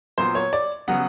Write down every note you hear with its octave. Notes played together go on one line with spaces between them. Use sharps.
A#2 F#3 B3 C5
C#5
D5
C#3 F#3 B3 F#5